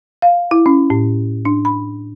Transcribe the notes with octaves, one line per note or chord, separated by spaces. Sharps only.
F5
E4
C#4
A2
D4
B5